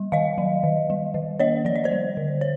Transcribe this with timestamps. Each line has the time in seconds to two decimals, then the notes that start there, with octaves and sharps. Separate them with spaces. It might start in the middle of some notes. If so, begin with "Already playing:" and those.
Already playing: G3
0.12 D#3 D#5 F5
0.38 F#3
0.63 D#3
0.90 G3
1.14 D#3
1.39 A#3 C#5 D#5
1.65 F3 D5
1.76 D#5
1.84 C5 D5
1.92 G3
2.17 D3
2.41 C#5